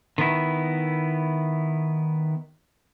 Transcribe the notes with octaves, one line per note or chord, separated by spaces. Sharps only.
D#3 B3 E4